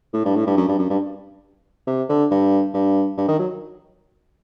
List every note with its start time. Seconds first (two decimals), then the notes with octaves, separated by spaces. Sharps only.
0.13 A2
0.25 G2
0.36 A2
0.47 G2
0.57 F#2
0.68 G2
0.79 F#2
0.90 G2
1.87 C3
2.09 D3
2.30 G2
2.74 G2
3.17 G2
3.28 D#3
3.39 F#3